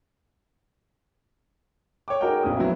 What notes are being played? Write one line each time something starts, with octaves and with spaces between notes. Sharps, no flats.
C#5 G5 D6
D#4 F#4 G#4 A#4 D#5 G5
A#1 F2 A#3 D#6
F#3 B3 C4 E4